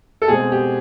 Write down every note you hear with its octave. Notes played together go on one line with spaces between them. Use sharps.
A4
B2 G#3 C4 G#4
G4